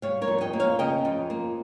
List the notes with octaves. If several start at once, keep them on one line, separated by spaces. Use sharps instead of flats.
G3 C#5 F5
A#4 C#5
F2
D#5 G5
A#3
C#5 F5
C#3 D#5 G5
F2
A#3